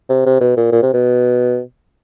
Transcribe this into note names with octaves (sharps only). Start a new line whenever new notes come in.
C3
C3
B2
A#2
A#2
C3
B2